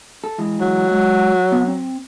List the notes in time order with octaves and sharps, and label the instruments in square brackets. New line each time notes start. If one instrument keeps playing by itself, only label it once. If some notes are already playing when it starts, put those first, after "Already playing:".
[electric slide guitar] A4
E3 G#3
[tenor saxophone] F#3
[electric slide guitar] G#3 F#5
B3
C4